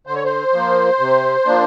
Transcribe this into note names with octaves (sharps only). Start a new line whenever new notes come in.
D3 C5
C#5
C5
F3 A#3
C3
F3 A#3 D4